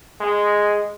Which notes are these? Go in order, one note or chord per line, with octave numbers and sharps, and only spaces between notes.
G#3